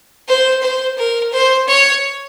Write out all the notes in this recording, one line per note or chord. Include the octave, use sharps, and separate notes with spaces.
C5
C5
A#4
C5
C#5